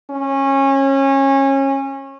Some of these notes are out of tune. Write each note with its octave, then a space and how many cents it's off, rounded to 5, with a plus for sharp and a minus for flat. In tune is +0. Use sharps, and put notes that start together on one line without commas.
C#4 -25